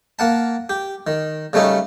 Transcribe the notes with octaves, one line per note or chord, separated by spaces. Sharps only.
A#3 F#5 A5
G4
D#3
C#3 G3 A3 C#4 D#4